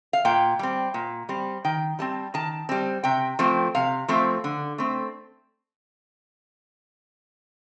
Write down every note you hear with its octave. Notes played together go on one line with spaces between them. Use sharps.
F5
A#2 G5
G3 C4
A#2
G3 C4
D#3 G5
G3 C4 A5
D#3 A5
G3 C4
C3 G5
F3 A3 C4
C3 F5
F3 A3 C4
D3
A3 C4